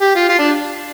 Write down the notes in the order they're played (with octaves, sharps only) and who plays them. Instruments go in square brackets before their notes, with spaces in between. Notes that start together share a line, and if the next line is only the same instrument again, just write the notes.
[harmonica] G4
F4
F4
D4